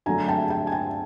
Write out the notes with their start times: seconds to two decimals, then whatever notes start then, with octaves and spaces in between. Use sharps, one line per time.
0.06 D3 F#3 A3 G#5 A#5
0.28 G5 A5
0.50 G5 A5
0.67 G#5
0.72 G5 A5